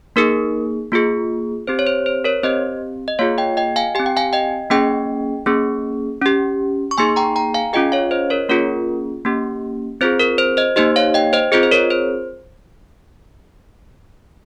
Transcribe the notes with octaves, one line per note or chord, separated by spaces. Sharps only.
A#3 D#4 G#4 A#4
A#3 F4 G#4
C4 G4 C5
C#5
C5
C5
A#4 C#5
C4 G4 C5 D#5
D#5
A#3 F4 G#4 C#5 F5
D#5 G5
D#5 G5
F5 G#5
C4 G4 G#5
G5
F5 G#5
D#5 G5
A#3 C#4 G#4 D#5 G5
A#3 C#4 G#4
C#4 G4
C#6
A#3 D#4 G#4 G#5 C6
G5 A#5
G5 A#5
F5 G#5
C#4 F4 G#4 D#5 G5
C#5 F5
C5 D#5
A#4 C#5
A#3 C#4 F4 G#4 A#4
A#3 C#4 G4
C4 F4 G#4 C5
A#4
C5
C5 D#5
A#3 D#4 G4 C5 D#5
C#5 F5
D#5 G5
C5 D#5
C4 F4 G#4 C5 D#5
C5
A#4 C#5
C5